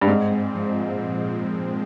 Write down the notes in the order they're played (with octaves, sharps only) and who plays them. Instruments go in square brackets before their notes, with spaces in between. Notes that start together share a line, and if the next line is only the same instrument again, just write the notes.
[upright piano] G2
[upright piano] G#2 [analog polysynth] C4
[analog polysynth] G#3
F3
A#2